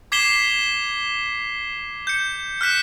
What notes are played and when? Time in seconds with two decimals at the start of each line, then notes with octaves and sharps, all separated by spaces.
0.12 D6 G#6 B6 C7 E7 G7
2.07 G6 C#7
2.61 F6 F#6 B6 E7